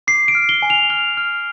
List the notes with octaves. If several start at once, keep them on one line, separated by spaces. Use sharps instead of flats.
D6 C7
D7
F6
G7
G#5
F7
F6 G7
F6